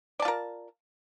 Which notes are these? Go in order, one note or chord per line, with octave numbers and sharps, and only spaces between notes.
F4 A#4 D5 A5